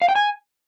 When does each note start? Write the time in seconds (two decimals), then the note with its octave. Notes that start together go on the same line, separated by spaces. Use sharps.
0.02 F5
0.09 G5
0.15 G#5